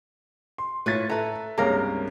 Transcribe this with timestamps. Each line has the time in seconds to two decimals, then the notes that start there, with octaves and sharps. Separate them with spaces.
0.58 C6
0.86 A2 F4 B4 C#5 A6 B6
1.09 A4 B4 E5 A#5
1.58 C#2 G2 C3 A#3 G#4 A#4 C#5 F5